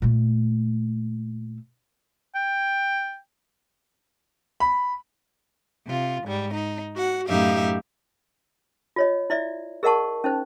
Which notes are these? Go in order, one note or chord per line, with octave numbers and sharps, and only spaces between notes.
A#2 A3
G5
B5
C3 F4
G#2 G3
D#4
F#4 F#5
F#2 A2 D#4 G4 E5 F5
F4 C#5 D#5
E4 D5 E5
G#4 A#4 D#5 F#5 A5 C#6
C#4 D#4 C5